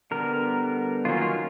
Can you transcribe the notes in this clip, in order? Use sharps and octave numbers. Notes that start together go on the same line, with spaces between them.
D3 G3 B3 A#4
D#3 F#3 A#3 C#4 F4
F4